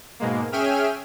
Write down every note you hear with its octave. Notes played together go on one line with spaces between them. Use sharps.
G#2 B2 G#3 A#3
C#4 G#4 E5 G5 F6 D#7